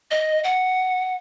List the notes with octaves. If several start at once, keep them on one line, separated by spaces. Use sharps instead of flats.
D#5
F#5